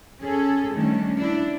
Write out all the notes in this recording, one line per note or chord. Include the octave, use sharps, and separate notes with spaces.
C#4 G#4 A4
D#3 G3 A3 C#4 D4
D4 E4